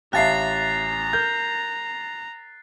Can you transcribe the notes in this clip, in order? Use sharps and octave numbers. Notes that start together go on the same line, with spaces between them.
A1 E5 F5 A5 A#5 F#6 A6 C7
A#4 G6